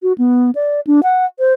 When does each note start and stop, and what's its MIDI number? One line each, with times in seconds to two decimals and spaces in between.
0.03 0.13 66
0.18 0.51 59
0.55 0.80 74
0.87 1.01 62
1.03 1.26 78
1.39 1.53 72